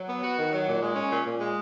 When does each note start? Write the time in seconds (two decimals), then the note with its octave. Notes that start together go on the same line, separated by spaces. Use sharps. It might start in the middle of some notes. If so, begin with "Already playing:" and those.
Already playing: F#3
0.08 B3
0.23 F#4
0.37 D#3
0.52 F#3
0.67 A#2
0.81 G#3
0.95 C#4
1.10 A#2
1.25 A#2
1.39 G#3